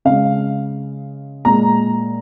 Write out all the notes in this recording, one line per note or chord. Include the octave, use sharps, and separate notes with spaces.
C#3 G#3 F5
A#2 G#3 A#5